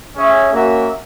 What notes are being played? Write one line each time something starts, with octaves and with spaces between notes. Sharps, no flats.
C#4 G#4 C#5 E5
A#3 C#4 F#4 A#4 E5